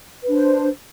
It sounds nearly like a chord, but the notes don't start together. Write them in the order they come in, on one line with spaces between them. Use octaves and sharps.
B4 D4 C5